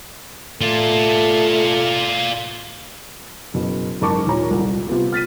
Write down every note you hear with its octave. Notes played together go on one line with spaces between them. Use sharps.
A3 F4 D5
F#1 B2
F#1 G#2 A#4 A5 C#6 D6
D#2 A#2 C#5 A#5
D#1 C2
C3 B3 F4
F6 A6 B6 D#7